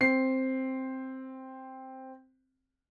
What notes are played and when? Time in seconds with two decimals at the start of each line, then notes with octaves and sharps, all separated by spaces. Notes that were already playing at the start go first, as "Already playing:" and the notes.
0.01 C4 C7